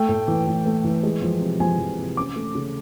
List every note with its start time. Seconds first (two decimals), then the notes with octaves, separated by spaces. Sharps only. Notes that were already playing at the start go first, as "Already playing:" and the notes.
Already playing: A3 G5
0.08 A2
0.28 E3
0.47 E3
0.66 A3
0.84 E3
1.03 G#3
1.22 F3
1.41 C3
1.60 F3 G#5
1.79 F3
1.98 C3
2.17 C#4 D6
2.36 A3
2.55 C#3